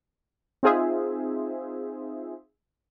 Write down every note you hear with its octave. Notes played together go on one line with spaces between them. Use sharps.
C4 D#4 F4 G#4 C5 E5